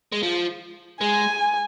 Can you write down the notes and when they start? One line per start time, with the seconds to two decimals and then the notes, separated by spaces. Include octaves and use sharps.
0.12 G#3
0.23 F3
1.01 G#3 G#5